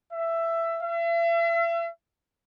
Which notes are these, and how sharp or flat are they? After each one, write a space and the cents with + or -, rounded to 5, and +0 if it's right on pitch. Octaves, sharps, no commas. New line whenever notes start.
E5 +15
E5 +40